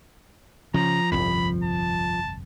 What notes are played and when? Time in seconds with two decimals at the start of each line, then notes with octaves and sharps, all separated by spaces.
0.74 C#3 F3 A#5
1.12 G1 C2 F2 B5
1.64 A5